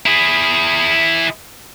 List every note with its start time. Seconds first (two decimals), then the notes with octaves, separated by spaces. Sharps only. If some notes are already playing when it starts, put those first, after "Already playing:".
0.06 E4 G#4